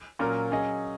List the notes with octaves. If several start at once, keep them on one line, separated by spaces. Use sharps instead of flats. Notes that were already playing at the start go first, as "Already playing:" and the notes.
A#2 F#3 C#4 A#4
F#3 C#4 G#4 D#5